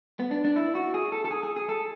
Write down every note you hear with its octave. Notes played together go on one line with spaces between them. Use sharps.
B3
D4
D4
E4
F#4
G#4
A4
A4
G#4
G#4
G#4
A4